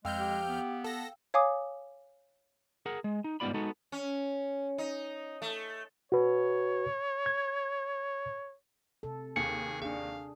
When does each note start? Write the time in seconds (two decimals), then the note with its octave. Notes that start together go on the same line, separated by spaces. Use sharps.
0.05 F2 G#3 F5 G5 E6 F6 G6
0.19 G4
0.48 B3
0.85 A4 A#6
1.34 C#5 F5 G#5 D6 D#6
2.86 G#4 A#4 F#5
3.04 G#3
3.24 D#4
3.40 G#2 G3 B3 F4 D5 B5
3.54 G#3 B3 D#4 F#4 A4
3.92 C#4
4.78 D#4
5.42 A3
6.12 F#4 B4 C#5
7.26 G#6
9.03 C3 A4
9.36 D#2 G#4 C#7
9.82 D4 G#4 F5